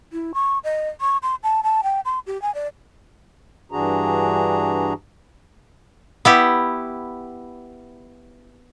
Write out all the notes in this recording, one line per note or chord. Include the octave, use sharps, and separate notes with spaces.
E4
C#6
D#5
C#6
C6
A5
A5
G5
C6
G4
G#5
D5
G2 E3 D4 F#4 G#4 A#5
B3 E4 G4